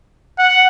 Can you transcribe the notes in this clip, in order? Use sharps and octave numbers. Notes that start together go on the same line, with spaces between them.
F#5